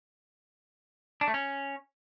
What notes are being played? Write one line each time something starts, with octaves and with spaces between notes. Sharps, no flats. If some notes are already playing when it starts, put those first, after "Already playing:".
D4
A3
C#4